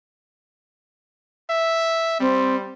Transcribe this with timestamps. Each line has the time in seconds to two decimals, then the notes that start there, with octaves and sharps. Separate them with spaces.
1.50 E5
2.20 G3 C4